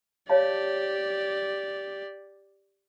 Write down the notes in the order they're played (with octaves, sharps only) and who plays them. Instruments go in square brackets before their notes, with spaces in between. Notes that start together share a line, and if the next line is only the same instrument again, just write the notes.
[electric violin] G4 D5 [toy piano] C#5 F5 A5